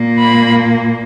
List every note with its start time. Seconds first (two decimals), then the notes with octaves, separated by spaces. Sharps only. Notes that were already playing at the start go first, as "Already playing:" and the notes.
Already playing: A#2 A#3
0.19 B5